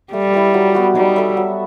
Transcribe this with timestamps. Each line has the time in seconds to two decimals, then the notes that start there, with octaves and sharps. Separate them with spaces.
0.13 G3 A3
0.33 E4 G4 B4
0.54 F#3
0.75 B3 F#4
0.95 G3 D#4
1.16 A4 E5
1.37 F#3